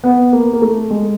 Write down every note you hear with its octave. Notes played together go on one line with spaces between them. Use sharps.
B3
A#3
A#3
A3
G#3